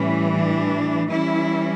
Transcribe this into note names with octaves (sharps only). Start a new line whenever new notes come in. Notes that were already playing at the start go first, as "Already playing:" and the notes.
Already playing: A2 E3 G3 C#4
D4
E3 G3 C#4 E4